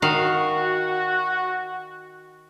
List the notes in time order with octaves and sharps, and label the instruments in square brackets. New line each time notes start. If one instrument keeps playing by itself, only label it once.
[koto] D#3 F5 [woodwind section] F#4